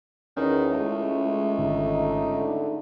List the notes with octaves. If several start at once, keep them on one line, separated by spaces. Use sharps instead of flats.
E2 D#3 C#4 E4
C#2 G#3 A3
G#1 D3 D#4
D3 D#4